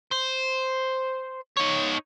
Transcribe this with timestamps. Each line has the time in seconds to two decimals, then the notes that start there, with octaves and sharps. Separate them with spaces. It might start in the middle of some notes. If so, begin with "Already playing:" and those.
0.12 C5
1.57 D#4 C#5